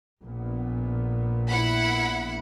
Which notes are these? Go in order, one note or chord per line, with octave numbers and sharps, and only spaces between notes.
A#1 A#2 B3
E4 F#5 B5